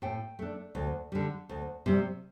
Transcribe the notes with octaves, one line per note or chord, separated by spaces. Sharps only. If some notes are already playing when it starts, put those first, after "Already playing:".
A2 G5
A3 D4
D2
D3 G3
D2
C3 G3